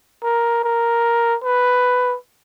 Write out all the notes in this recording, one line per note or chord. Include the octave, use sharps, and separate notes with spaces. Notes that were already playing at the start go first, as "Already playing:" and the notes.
A#4
A#4
B4